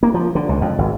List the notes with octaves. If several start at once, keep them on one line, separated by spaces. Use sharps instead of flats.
A#3
F3
D3
C#2
F2
G#1